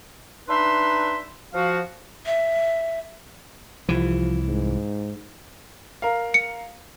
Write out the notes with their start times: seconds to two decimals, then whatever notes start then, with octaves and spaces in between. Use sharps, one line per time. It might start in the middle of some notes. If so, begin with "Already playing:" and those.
0.48 D4 D#4 B4 E5 B5 C6
1.54 F3 F#4 F5
2.26 E5
3.89 C2 E3 F3
4.48 G#2
6.02 A#4 F5
6.34 C#7